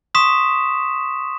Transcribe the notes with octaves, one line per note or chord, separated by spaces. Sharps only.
C6 C#6 D#6 B6 E7